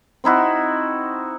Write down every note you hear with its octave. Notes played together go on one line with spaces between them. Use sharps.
C4 D#4 E4 F#4